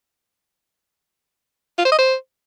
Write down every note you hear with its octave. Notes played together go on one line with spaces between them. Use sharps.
F4
C5
D#5
C5